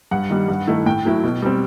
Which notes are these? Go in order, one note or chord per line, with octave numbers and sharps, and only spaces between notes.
G2 F#5
D#3 G3
G2
D#3 A3 E4
A2 G5
F#3 A3 E4
B2
G3 C4